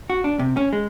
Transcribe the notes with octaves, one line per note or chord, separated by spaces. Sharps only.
F#4
D4
C3
C#4
G#3